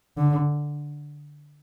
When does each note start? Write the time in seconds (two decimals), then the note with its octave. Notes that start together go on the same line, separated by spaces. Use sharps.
0.17 D3